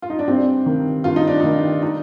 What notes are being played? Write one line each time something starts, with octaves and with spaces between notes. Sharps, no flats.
F4
D#4
D4
G2 C4
D#3
G2 F4
D#4
D4
D#3 D#4
D#4